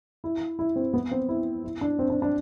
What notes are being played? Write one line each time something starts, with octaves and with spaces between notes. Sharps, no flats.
E4
E4
C4
B3
C4
E4
E4
D4
C4
D4
D4